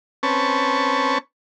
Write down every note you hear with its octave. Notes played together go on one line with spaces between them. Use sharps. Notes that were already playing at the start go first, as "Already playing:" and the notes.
C4 C#4 B4 A5 C#6